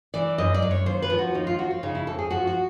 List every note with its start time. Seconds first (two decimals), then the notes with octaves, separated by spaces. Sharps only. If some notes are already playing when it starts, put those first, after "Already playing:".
0.14 E3 D5
0.38 F#2 D#5
0.54 D5
0.62 F#2
0.71 C#5
0.86 D#2 C5
1.02 B4
1.10 F3
1.19 F#4
1.34 D#2 D#4
1.47 F4
1.58 F3 F#4
1.71 F4
1.83 C#3 D#4
1.95 E4
2.07 F2 A4
2.19 G#4
2.30 F3 F#4
2.47 F#4